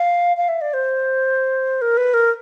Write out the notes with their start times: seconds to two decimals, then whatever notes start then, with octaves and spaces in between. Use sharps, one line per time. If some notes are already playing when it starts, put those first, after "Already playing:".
Already playing: F5
0.37 F5
0.49 E5
0.61 D5
0.73 C5
1.81 A#4
1.97 B4
2.14 A#4